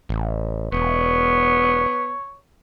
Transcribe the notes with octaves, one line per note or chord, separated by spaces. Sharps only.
A1
E1 B3 C#5